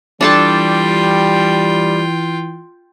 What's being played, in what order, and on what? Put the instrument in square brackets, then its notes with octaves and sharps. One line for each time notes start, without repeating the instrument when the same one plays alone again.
[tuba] E3 [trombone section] G3 [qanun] D4 A4 A5 [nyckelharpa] F4 G5